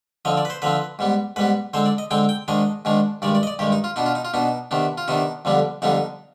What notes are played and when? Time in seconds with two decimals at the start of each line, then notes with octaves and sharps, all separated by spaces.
0.25 D3 F3 C4 D#5
0.37 D5
0.45 B4
0.50 C5
0.62 D3 F3 C4 B4
0.99 G#2 G3 B3
1.36 G#2 G3 B3 B4
1.73 D3 G#3 C4 C5
1.86 D5
1.98 D#5
2.11 D3 G#3 C4 G5
2.29 G5
2.48 G#2 D#3 G#3 D4 D#5
2.85 G#2 D#3 G#3 D4
3.22 G2 D#3 G#3 D5
3.35 D5
3.43 D#5
3.47 D5
3.59 G2 D#3 G#3 G4
3.72 D#4
3.84 F4
3.96 B2 B3 D4 D#4
4.06 F4
4.15 D#4
4.25 F4
4.34 B2 B3 D4 D#4
4.71 C3 D#3 B3 D4
4.98 F4
5.08 C3 D#3 B3 D4 D#4
5.45 F2 D3 G3 B3 D4
5.82 F2 D3 G3 B3 D4 D#4